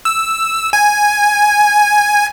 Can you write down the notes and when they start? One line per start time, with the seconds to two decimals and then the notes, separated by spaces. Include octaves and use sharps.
0.05 E6
0.73 G#5